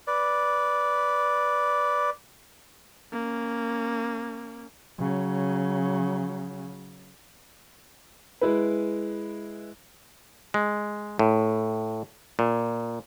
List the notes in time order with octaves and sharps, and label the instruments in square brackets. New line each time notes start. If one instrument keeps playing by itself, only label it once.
[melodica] B4 D5
[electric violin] A#3 C#4
[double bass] C#3 F#3
[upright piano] G#3 E4 B4
[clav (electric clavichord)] G#3
A2
A#2